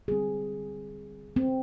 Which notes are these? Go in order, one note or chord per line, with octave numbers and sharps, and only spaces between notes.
D3 G3 C4 G#4
C4